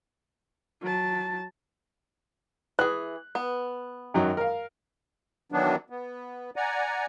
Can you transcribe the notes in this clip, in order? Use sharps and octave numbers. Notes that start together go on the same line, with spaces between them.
F#3 A5
E3 G#4 F#6
B3
F#2 D#3 F#3
A#4 F5
D#3 E3 F#3 B3 D4
B3
D5 F#5 G#5 A#5